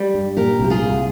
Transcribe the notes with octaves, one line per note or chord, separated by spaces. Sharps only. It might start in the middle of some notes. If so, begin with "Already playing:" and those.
Already playing: G3 G4
G2
A#2 G4 A#4
C2 G4
F4 G#4
C2